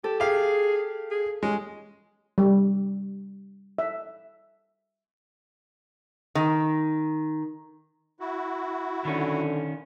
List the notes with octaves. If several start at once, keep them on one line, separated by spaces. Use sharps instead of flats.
G4 A4
G4 G#4 F5
G#4
G#3 C#4
G3
E5
D#3
E4 F#4
D3 D#3 C#4